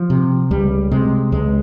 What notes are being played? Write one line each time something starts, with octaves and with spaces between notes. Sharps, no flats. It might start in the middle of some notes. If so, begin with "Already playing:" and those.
Already playing: F3
C3
C#2 G3
C3 G#3
C#2 G#3